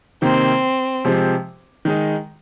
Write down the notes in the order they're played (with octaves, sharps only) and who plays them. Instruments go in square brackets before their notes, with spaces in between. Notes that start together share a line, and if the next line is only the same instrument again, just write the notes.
[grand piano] C3 D#3 A#3 [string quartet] C4
[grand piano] C3 F3 G#3 C4 G4
D#3 G#3 D#4